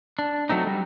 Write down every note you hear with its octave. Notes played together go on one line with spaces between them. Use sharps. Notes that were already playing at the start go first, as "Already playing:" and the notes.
D4
F#3 A3 C4 D#4
G3